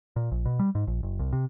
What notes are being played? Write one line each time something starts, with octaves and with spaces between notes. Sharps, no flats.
A#2
A#1
B2
G3
G#2
A#1
F#1
C2
C3